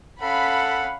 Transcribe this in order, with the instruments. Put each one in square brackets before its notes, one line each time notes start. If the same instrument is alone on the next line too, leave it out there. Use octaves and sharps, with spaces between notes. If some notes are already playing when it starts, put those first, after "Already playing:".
[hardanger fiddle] C#4 F5 [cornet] A4 [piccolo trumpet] F#5 [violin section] B5